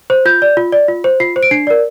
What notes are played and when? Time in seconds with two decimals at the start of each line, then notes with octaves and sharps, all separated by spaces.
0.10 C5
0.25 F4 G6
0.42 D5
0.57 F4
0.72 D5
0.88 F4
1.04 C5
1.20 F4 C7
1.36 C5
1.43 D7
1.51 D4 C7
1.67 A#4 D5